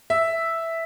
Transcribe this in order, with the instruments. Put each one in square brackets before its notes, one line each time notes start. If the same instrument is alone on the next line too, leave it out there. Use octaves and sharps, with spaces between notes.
[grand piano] E5